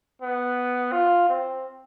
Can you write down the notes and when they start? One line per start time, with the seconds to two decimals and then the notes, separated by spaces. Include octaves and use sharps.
0.22 B3
0.92 F4
1.29 C4